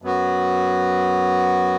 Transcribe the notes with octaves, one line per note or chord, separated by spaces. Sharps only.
F#2 F#3 B3 F#4